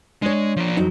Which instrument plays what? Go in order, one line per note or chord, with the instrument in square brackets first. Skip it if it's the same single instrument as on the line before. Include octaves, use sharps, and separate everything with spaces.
[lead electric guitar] G#3 [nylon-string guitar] D4 C#5
[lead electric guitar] F3 D5
[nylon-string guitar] F2 F#3 D#4